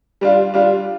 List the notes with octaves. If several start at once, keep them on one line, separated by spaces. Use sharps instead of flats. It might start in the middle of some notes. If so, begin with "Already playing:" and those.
G3 D4 F4
G3 D4 F4